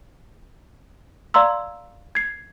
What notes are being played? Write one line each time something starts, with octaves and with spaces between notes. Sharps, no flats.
D5 F5 A#5 C6 E6
G#6 C7